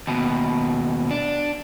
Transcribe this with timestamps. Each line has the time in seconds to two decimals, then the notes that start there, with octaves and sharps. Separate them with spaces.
0.07 D#2 B2
1.11 D4